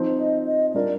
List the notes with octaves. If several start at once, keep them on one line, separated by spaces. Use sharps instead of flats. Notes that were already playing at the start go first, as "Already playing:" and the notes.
Already playing: F3 C4 D#4
D#5
D#5
G3 D4 F4 A#4 D5